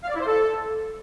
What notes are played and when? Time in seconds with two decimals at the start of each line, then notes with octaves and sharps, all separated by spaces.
0.04 F5
0.09 D5
0.15 E4
0.21 C5
0.26 A4